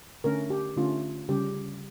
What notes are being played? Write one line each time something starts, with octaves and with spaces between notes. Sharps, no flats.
D3 A3 C#4 A#4
G4
D3 A3 C#4 F4
C#3 G3 C#4 G4